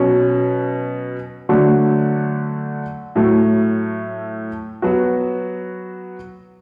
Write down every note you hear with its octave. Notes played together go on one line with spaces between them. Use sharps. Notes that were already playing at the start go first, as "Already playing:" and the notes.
Already playing: B2 F#3 C#4
D3 F#3 A3
A2 F#3 A3
F#3 B3 F#4